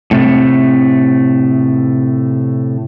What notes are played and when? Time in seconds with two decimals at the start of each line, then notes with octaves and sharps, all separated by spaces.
0.11 A2 C3 A3